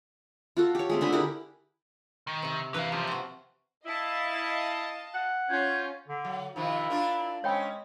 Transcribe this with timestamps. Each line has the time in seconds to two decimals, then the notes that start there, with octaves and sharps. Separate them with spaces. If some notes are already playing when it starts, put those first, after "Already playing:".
0.57 F4 F#4 A4
0.75 G4 C#5
0.90 G#3 A3 C4
1.01 D3 G#4 B5
1.13 E4 G4 A#4
2.27 D#3
2.42 C3 C4
2.74 E3 A#4 B4 F5 A#5
2.92 F3 F4 G4
3.07 C4 F#4
3.85 E4 D#5 F5 A5
5.12 F#5
5.50 C#4 F4 G6 G#6
6.08 D3
6.25 F#3
6.56 C3 D#3 F3 E4
6.90 D4 F4 A#4
7.44 G#3 C4 C#4 C#5 G5 B5